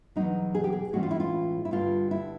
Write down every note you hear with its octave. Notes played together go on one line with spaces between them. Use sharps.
E2 B2 F#3 D#4
G#4
G4
G#4
A2 E3 G#3 C#4 F#4
F4
E4
F4
E4
G2 D3 G3 F4
E4